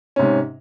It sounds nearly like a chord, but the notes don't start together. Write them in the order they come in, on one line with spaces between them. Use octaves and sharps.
C#4 C3 G#2